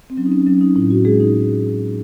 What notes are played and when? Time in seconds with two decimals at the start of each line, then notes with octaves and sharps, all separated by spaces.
0.10 C4
0.17 F#3 C#4
0.26 D#4
0.32 C#4
0.47 F#3 C#4
0.61 D#4
0.76 A2 E4
0.90 F#4
1.05 G#3 G#4
1.20 D#4